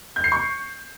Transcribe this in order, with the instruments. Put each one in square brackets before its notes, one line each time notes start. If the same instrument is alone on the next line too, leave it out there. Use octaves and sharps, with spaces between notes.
[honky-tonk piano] G6
C7
C#6